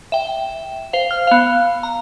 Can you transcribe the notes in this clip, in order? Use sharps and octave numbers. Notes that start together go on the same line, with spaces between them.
E5 G5
C5 F5
F6
B3 F5
A#5